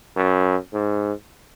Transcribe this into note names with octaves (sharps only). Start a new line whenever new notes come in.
F#2
G#2